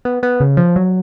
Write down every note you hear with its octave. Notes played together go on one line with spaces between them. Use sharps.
B3
B3
C#3
F3
F#3